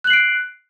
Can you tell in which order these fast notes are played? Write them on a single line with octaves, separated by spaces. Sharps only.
F#6 F#7 C7 D7